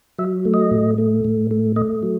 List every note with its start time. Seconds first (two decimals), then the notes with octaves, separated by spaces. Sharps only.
0.19 F#3 E5
0.45 A3
0.54 D#5
0.71 A2
0.98 A3
1.24 A2
1.51 A3
1.76 A3 D#5
2.03 F#3